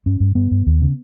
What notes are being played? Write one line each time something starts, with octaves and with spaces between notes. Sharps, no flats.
G2 C#4
G2
G2 B3
G2
D#2
C#3